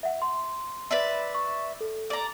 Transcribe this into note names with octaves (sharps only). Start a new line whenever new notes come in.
E5 F#5
C6
B4 D5 E5
C#6
A4
D5 A#5